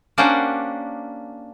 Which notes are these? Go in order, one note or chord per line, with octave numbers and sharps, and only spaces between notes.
A#3 C#4 D4 G4 C5 F#5